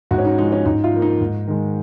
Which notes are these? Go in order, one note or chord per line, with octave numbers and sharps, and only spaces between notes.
G#2 F#4
C#4
D#4
F3 G#3 D#4
C#4
G#2 D#4
F4
F3 A#3
D#4
G#2
D#3 G#3